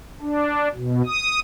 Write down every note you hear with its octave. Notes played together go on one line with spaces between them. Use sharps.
D4
B2
D#6